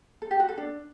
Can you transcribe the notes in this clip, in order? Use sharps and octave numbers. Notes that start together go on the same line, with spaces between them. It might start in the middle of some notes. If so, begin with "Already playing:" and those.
A4
G4
F#4
A4
D4